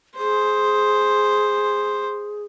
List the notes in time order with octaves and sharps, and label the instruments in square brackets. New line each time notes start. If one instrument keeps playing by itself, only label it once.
[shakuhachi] G#4 [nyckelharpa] C5